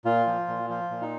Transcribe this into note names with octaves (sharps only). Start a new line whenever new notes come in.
A#2 F4
F3
A#2
F3 F4
A#2
D#4